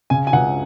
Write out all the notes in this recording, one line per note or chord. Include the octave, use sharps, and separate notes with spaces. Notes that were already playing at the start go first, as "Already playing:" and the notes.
C#3 G#5
G#5
C#2 F#5